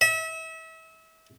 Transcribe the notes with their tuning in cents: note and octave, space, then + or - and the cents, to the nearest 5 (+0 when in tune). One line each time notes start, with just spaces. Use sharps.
E5 -35